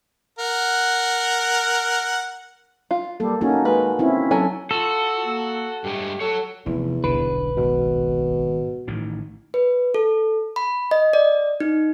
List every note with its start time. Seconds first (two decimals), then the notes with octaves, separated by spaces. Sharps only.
0.39 A#4 F#5
2.91 F4
3.20 G3 A#3 A4
3.41 A#3 C#4 D#4 F#4
3.65 G#3 B4
3.99 C4 C#4 E4
4.31 F#3 A4 G#5
4.71 F4 F#4 A4
5.25 A#3
5.84 G2 G#3 A3 G4
6.21 F#4 A4 C#5
6.66 F1 E2 E3
7.04 D#1 B1 D3 B4
7.57 G#1 B2
8.88 A1 A2 D#3
9.54 B4
9.94 A4
10.56 B5
10.91 D#5
11.13 D5
11.60 D#4